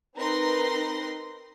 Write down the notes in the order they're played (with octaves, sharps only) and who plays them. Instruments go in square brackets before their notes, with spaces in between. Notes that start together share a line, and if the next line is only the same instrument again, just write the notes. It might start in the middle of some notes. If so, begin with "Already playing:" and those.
[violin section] C4 D#4 A#4 B4 C6 A#6